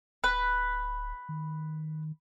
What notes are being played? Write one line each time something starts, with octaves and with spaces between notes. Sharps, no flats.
D1 B4
D#3